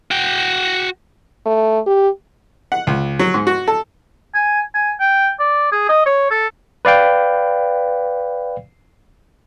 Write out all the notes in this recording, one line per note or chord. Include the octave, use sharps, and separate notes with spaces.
F#4 G5
A3
G4
F#5
C#2
F#3
G#2
F#4
A4
G#5
G#5
G5
D5
G#4
D#5
C#5
A4
B4 D5 F5 G5